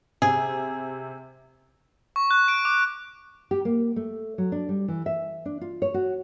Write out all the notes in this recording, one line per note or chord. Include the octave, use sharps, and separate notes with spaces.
C3 G#4
C#6
F#6
D7
D6
G4
A#3
A3
F#3
D4
G3
E3
E5
D4
F4
C#5
F#4